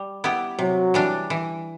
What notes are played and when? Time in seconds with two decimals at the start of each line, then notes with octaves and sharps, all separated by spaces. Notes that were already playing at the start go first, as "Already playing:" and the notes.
Already playing: G3
0.24 B3 E4 G4
0.59 C3 F#3
0.94 E3 G3 D4
1.30 E3